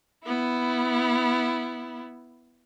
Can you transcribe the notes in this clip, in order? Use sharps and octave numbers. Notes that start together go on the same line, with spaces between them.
B3 E4